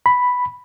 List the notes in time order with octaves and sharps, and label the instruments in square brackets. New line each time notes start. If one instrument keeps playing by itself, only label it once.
[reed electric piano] B5